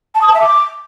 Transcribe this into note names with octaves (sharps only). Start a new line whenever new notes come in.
A5
D#6
A5
E5
D6